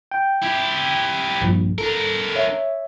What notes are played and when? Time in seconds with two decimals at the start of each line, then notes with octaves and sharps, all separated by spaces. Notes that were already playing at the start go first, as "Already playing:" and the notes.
0.11 G5
0.43 E4 G4
1.41 A#1 G2
1.78 D4 A4 A#4
2.35 C#5 E5